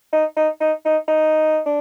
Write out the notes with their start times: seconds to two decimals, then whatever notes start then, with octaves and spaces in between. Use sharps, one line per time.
0.13 D#4
0.37 D#4
0.60 D#4
0.85 D#4
1.08 D#4
1.66 D4